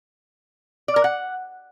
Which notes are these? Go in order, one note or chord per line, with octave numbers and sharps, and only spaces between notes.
D5
A#4
F#5